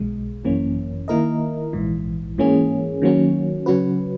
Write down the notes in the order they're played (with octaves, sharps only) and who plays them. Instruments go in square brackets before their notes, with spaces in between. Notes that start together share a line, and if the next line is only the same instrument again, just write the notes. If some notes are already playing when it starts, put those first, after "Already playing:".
Already playing: [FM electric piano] B1 B2 G#3
G#1 F#2 E3 A#3 C#4
D#3 A#3 E4 A#4 D#5
A#1 G#2 E3
G#2 E3 A#3 C#4 G#4
D#3 F#3 A#3 C#4 F#4
C#3 F#3 C#4 F#4 B4